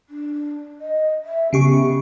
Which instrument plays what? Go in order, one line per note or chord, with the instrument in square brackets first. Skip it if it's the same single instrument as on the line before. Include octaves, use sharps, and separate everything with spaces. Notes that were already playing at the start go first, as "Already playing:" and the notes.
[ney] D4
D#5
E5
[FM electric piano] C#3 G4 C#6 [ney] B3